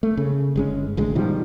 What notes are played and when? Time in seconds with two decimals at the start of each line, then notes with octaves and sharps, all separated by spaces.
0.03 A3
0.17 C#3
0.56 G1 G#3 C#4
0.97 A1 D2 G#3
1.15 B2 D#3 F3 G3